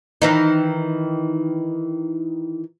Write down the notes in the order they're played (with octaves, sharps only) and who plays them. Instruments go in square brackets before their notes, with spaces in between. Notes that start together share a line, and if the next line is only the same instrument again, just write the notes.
[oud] D#3 E3 D#4